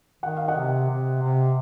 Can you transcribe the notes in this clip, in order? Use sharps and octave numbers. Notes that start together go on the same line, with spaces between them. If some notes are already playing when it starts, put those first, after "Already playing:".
D#3 F#5
F5
D#5 F#5
C3
C3
C3